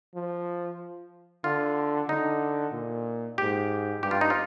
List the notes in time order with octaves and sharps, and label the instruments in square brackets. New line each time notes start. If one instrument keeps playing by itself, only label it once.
[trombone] F3
[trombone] D3 [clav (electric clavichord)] F4
[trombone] D3 [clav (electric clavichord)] D#4
[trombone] A#2
[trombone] G#2 [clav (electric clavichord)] G4
[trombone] G2 [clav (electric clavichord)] G4
[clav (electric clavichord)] F4
D#4
F4